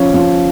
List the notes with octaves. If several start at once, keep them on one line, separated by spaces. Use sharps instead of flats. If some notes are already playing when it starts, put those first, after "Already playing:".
Already playing: F3 C#4
F3